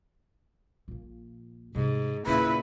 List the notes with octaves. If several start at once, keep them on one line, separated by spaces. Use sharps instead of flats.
A#1 A#2
G#2 C3 A3
E2 A#2 C#3 A#3 E4 B4